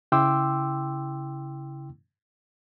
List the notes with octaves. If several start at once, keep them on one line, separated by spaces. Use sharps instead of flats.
C#3 E4 G5 C6 D6 E6